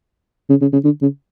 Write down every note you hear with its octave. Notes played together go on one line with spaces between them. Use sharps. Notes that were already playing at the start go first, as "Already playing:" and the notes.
C#3
C#3
C#3
D3
C#3